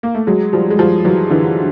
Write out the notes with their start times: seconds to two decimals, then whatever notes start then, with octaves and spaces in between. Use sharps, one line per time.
0.03 A#3
0.14 A3
0.27 F#3 G#3
0.53 F3 G3
0.70 G#3
0.79 F3 G3
1.04 E3 F#3
1.30 D3 E3